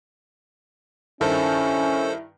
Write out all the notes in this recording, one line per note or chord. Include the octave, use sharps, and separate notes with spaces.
G2 D#3 C#4 E4 A4 C5 A5